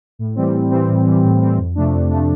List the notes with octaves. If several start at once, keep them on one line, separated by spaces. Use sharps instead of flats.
A2
E3 G3 C4
A2
E3 G3 C4
A2
E3 G3 C4
A2
E3 G3 C4
F2
C3 F3 A3 D4
F2
C3 F3 A3 D4